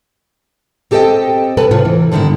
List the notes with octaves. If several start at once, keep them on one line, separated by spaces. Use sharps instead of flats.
C4 G4 A4 D5 D#5 G5
G2 C3 A4 B4 G#5
A2 C3 F4
E3
G2 D3 D#3 B3 E4